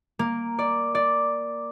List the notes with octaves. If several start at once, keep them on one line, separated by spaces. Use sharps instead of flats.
A#3
D5
D5